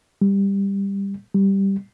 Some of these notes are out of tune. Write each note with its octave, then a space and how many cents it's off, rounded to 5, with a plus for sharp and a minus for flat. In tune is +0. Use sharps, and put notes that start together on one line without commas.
G3 +15
G3 +0